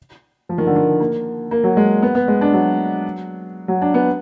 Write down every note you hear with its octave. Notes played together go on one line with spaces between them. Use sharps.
F3
D#3
D3
D#3
A#3
A#3
F#3
G#3
B3
B3
G#3
D4
F#3
F#3
D4
B3